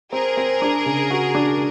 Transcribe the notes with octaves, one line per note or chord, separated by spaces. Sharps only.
C4 G#4 A#4
C4
D4
C#3
F#4
D4